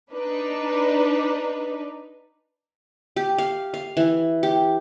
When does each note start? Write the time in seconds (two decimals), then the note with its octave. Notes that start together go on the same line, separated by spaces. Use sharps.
0.12 D4 D#4 B4
3.16 G4
3.38 F5
3.74 F5
3.97 E3
4.43 G4